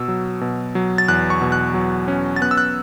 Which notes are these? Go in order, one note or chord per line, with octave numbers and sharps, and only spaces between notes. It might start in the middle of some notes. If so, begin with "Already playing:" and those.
Already playing: B2 E6
F#3
B2
F#3
A6
E2 F#6
C#6
B2
F#6
F#3
C#4
A6
B3 F#6
E6
F#6